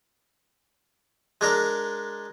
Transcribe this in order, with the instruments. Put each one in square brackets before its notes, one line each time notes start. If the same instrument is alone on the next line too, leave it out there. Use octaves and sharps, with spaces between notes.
[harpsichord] G#3 D4 A#4